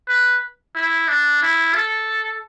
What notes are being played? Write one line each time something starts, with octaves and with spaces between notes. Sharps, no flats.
B4
E4
D4
E4
A4